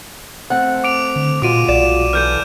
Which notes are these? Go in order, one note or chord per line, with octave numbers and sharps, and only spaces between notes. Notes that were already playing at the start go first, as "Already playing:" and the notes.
A3 C4 F#5
D6 D7 F7
D3
A#2 G#3 F4 F#4 D6 D7 D#7
B1 D5 E7
E3 A4 F6 G6 D#7